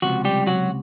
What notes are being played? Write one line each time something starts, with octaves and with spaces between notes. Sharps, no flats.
C#2 C3 F3 F#3 F#4
G3 G4
F#3 F#4